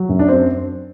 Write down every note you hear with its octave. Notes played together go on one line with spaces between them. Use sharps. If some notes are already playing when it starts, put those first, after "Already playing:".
Already playing: F#3
F#2
D4
C4